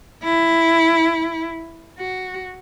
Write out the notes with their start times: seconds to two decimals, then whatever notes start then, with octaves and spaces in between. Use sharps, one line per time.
0.24 E4
1.99 F#4